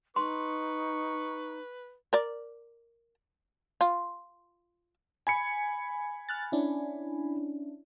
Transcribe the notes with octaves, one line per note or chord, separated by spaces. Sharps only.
D#4 B4 C6 C#6
A#4 D5
F4
G#5 B5 C#7
F6 F#6 A6
C#4 D4 E4